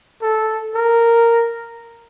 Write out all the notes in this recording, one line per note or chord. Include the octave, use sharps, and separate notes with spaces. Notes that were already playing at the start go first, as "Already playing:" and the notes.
A4
A#4